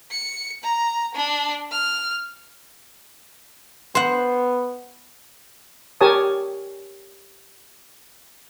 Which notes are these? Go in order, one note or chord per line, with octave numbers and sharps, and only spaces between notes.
C#7
A#5
D4
F6
B3 C5 F#5
G4 A#4 C#5 G#5 A5 D#6